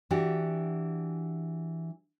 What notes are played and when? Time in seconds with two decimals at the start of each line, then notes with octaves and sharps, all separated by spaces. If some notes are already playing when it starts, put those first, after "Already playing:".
0.11 E3 D4 F#4 G4